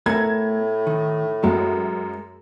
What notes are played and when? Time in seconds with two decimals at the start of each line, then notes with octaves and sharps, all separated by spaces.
0.06 A2 A3 B3 A#4 G#6
0.87 D#3
1.44 F#2 G#3